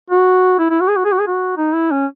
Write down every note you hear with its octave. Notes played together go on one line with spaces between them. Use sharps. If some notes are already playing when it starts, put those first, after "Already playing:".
F#4
E4
E4
F#4
G#4
F#4
G#4
F#4
G#4
F#4
D#4
E4
C#4